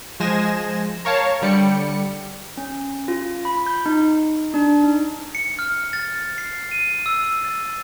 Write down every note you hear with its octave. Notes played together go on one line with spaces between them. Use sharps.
F3 G#3 C5 G#5 A#6 E7
A#4 C#5 F5 A5
D3 G3 G4 C#7
C#4
F4
B5
G6
D#4
D4
D#4
C#7
F6
A6
C7
D#7
E6
A6